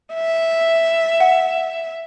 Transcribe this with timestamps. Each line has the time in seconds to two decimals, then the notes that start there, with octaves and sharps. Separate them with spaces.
0.14 E5
1.20 F#5